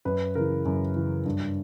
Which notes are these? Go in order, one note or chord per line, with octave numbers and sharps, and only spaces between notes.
F#2 B4
C#3 E3 A#4
F#2
C#3 E3
G2